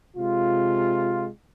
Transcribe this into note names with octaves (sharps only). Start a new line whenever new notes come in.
C3 G#3 F4